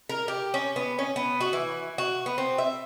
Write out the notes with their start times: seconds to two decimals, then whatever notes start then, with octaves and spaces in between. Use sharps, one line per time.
0.09 A#4
0.28 G4
0.54 C#4
0.76 B3
0.99 C#4
1.16 B3
1.41 F#4
1.53 E3
1.98 F#4
2.26 B3
2.38 C4
2.58 E5